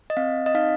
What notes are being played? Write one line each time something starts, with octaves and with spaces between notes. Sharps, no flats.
D#5
C4 F5
D#5
D#4 F5